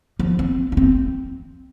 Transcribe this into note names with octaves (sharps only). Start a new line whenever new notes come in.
F3
C4
D4
C4